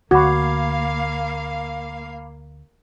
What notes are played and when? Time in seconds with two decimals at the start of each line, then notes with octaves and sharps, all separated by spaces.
0.11 D2 A#3 F#4 F5 B5 D6 G#6